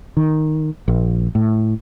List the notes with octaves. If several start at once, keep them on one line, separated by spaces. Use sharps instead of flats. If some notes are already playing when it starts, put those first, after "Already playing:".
D#3
A#1
A2